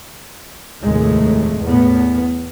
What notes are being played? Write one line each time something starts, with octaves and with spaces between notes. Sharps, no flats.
F1 D#2 A2 G#3 A3
E2 A2 B3